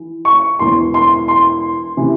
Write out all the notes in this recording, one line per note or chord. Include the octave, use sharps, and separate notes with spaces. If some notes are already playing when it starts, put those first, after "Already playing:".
Already playing: E3
C#6
E1 E2 E3 C6
C6
C6
C3 E3